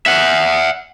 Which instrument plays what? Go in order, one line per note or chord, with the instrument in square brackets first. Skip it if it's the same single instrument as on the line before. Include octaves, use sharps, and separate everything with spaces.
[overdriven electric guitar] E5 F#5